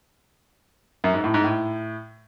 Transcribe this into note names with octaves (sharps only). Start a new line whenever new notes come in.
F#2
G#2
A2
G#2
A2